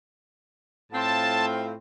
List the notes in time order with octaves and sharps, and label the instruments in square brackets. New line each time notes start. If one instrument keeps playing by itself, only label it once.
[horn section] A2 C4 F4 [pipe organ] A5